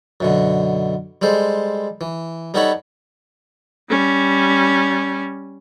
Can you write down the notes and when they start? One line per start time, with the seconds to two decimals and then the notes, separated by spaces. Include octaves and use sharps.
0.20 F#2 B2 D3
1.22 G3 G#3 A4 C5
2.01 E3
2.54 G3 B3 D#4 A4 C#5 B5
3.90 G3 C#4